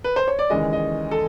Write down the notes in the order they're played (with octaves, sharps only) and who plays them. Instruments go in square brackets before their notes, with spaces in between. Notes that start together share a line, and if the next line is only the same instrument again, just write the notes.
[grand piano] B4
C5
C#5
D5
D#2 C#3 E3 G#3 D#5
D#5
A4